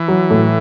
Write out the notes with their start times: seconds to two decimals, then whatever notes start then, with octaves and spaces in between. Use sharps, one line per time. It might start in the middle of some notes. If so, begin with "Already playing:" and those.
Already playing: E3
0.08 F#3
0.30 A2